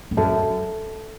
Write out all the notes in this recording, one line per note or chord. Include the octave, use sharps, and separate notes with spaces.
A2
F#2 A4 E5 A5